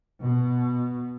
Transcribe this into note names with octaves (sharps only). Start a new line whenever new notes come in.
B2